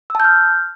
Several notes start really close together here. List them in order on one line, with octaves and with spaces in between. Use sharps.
E6 A5 G6 F6